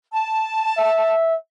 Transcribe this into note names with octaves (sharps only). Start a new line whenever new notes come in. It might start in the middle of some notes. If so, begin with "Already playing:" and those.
A5
E5